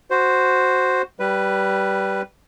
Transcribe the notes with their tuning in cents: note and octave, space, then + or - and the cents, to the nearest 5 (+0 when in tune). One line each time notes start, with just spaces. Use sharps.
F#4 +0 C5 +0
G3 -10 B4 +0